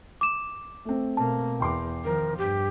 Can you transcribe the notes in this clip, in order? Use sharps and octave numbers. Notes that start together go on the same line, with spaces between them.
D6 E7
A3 C4
B2 A#3 A5
E2 G5 C6 D6
D#3 F3 A#4
G2 G4